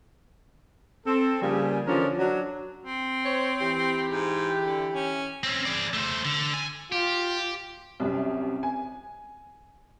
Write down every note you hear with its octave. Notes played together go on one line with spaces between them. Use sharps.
C4 A4
C#3 F3 G3 A#3 G#4
D3 E3 F3 C#4 A#4 D5
F#3 D4
C4
C5 C#5
E3 G4
G#2
D3
C#4
C4 C#4
G#4 D5
A3 C5
D3
G#5
F4 G4
C2 F#2 C3
G#5